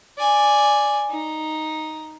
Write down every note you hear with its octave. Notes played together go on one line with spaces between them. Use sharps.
D5 G#5
D#4